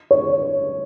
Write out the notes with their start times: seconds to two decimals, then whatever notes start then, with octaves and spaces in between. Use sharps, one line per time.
0.11 C#5